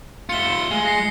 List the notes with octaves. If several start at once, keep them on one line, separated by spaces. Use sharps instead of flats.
F4 E5 C#7 G7
G#3
A#6 C7